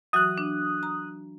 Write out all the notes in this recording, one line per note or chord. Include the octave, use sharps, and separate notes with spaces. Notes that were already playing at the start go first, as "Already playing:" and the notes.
E3 F#3 F#4 D#6 F#6
D4
A#5